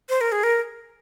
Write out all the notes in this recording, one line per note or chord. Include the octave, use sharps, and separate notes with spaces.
C5
A#4
G#4
A#4